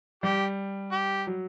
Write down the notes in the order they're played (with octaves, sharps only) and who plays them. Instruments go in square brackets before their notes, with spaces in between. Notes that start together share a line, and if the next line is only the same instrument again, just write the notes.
[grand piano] G3 [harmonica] G4
[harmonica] G4
[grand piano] F#3